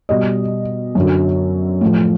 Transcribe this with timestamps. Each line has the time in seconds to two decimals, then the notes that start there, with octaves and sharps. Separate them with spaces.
0.09 B2 G3 D#5
0.95 F#2 D3 F#3
1.81 A2 F3